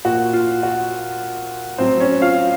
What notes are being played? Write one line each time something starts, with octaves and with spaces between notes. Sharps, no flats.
A#2 F3 F#4
F4
F#4
A2 F#3 C4 C5
C#4 C#5
F4 F5